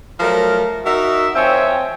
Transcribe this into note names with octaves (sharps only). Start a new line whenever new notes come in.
F3 F#3 A3 A#4
D#4 F#4 A#4 E5
F3 C4 C#5 E5 G5 G#5